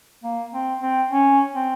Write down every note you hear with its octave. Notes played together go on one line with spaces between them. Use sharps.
A#3
C4
C4
C#4
C4